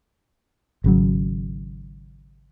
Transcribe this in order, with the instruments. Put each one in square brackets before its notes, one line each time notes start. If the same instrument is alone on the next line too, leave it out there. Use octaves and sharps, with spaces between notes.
[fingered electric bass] G#1 C#3 F#3